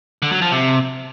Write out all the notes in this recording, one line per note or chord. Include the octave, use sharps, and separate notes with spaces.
D3
F#3
F3
C3